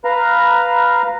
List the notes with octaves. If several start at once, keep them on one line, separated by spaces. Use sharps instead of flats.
B4 F5 A#5